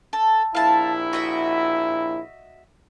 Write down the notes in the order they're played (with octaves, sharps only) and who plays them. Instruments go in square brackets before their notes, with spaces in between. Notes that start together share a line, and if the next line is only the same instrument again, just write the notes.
[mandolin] A4
[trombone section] A#1 E4 [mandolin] F5 A5
[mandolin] F#4 D#5 E5